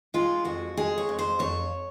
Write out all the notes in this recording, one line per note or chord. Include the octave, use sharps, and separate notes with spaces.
G#3 F4
F2 F#4
G#3 G#4
C#5
F2
C5
F2 C#5